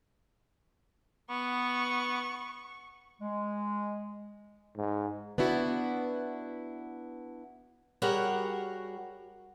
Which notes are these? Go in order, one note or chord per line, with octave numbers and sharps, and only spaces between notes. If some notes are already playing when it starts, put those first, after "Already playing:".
B3 C#6
G#3
G#2
B3 D4 E4 F#4
G3 F#4 G#4 A#4 C#5 F#5